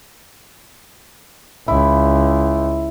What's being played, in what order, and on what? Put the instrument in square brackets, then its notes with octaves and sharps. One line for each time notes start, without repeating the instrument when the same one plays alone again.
[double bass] C#2 [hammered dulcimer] E4